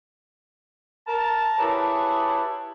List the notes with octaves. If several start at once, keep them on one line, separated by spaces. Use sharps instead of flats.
A#4 A5 A#5
E4 G4 G#4 B4 C#5 A5